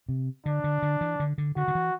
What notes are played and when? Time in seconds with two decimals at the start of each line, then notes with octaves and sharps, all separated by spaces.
0.09 C3
0.46 D3 D4
0.64 D3
0.82 D3
1.01 E3
1.20 D3
1.38 D3
1.56 D3 F#4
1.68 D3
1.75 E3